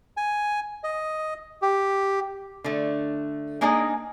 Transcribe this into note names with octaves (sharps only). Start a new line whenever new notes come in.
G#5
D#5
G4
D3 A3
G#3 A#3 D4 D#4 G#4 D#5